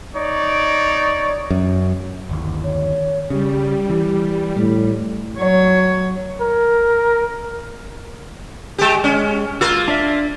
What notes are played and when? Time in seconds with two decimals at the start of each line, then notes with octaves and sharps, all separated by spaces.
0.15 D#4 C#5 D5
1.50 F#2
2.29 G1 D#2
2.64 C#5
3.30 C#3 G3 G4
3.90 E3
4.57 A2 G3
5.38 F#3 C#5
6.41 A#4
8.78 G#3 G4
9.04 G#3 C#4
9.61 A#3 F4 E6
9.88 D4 D5 E5